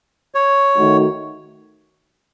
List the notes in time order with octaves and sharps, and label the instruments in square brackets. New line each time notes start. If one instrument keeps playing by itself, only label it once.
[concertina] C#5
[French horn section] D#3 A3 D#4 F#4